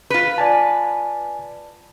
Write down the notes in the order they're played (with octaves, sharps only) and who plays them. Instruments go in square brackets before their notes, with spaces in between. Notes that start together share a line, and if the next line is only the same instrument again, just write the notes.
[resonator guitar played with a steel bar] F4 B4
[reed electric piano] D5 G#5 A5